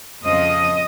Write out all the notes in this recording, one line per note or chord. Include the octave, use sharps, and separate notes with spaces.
F2 C#3 F3 D#5